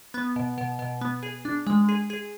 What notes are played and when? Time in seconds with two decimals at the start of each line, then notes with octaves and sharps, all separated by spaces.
0.14 B3
0.36 B2
0.58 B2
0.79 B2
1.01 B3
1.23 G#4
1.45 D4
1.67 G#3
1.89 G#4
2.10 G#4